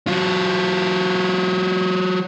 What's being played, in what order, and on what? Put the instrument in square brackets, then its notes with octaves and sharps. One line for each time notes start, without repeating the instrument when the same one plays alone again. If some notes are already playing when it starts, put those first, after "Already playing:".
[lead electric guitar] F#3 F4